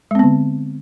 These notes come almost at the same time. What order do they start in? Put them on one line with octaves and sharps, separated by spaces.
G#3 C4 B3 D3